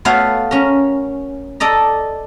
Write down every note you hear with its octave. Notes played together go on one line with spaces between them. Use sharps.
A3 B3 F#4 C#5 F5
C#4 A#4
A4 D5 D#5 A#5